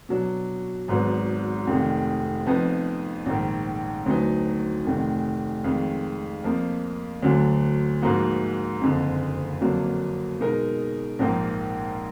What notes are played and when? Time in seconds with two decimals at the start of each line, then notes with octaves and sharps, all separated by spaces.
0.09 B2 F#3 D4
0.88 G#1 G#2 F#3 B3
1.68 F1 F2 D#3
2.46 F2 F3 B3 D#4
3.26 A#1 G#2 D#3
4.06 D2 D3 F#3 B3 D#4
4.85 F1 F2 D#3
5.64 F2 D#3 G#3
6.44 F2 F3 A#3
7.23 D2 D3 F#3
8.02 G#2 F3 A#3 D#4 F#4
8.81 F#1 F2 D3
9.60 F2 D3 F#3 A#3 D4
10.40 B2 G#3 D#4 A#4
11.19 A#1 G#2 F3 A#3 D#4